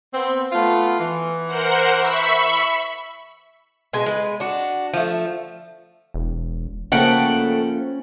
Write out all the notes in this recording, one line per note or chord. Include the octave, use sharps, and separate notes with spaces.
B3 C4
A3 B3 F4
E3
A#4 C5 F#5
E5 B5 C#6
B2 G#3 G#5
G#3 B4
D4 F#4
F3 A3
E1
C#3 F3 A3 A#3 C#4 F#5 G5